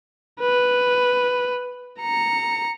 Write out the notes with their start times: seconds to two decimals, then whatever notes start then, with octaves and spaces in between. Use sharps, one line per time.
0.40 B4
2.00 A#5 C#7